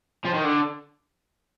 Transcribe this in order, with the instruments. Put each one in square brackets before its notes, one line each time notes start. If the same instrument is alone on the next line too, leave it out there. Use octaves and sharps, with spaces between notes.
[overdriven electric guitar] F3
D#3
D3